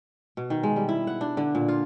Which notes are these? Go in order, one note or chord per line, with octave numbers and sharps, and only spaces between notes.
B2
D#3
G#3
G3
E4
F#5
D4
D3
A#2
F4